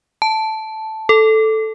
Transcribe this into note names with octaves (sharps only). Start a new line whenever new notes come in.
A5
A4